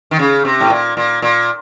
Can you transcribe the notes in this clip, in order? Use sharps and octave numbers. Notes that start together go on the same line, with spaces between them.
D#3
C#3
C3
A2
A#2
A#2
A#2